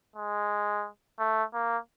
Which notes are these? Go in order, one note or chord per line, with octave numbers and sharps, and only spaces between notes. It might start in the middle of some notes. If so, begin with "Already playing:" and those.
G#3
A3
A#3